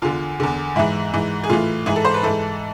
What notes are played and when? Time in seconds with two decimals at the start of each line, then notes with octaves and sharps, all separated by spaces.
0.02 E2 D3 F4
0.40 E2 D3
0.76 G#2 E3 E4
1.14 G#2 E3
1.43 G#4
1.49 A2 E3 F4
1.86 G#2 E3 G#4
1.96 A4
2.05 C5
2.14 B4
2.23 G#2 E3 A4